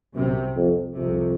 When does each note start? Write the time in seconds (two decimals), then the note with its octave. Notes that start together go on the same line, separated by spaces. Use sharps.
0.15 C2 F#2 C3
0.56 F2
0.96 C2 F2 C3